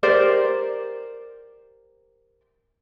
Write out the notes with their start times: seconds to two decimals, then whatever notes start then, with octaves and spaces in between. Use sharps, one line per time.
0.03 G4 A#4 C5 D5